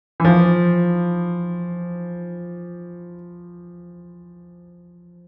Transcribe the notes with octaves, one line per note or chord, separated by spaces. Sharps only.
E3
F3